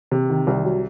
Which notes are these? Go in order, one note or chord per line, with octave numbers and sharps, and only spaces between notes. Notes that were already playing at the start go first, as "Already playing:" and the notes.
C3
D#3
C2
F#3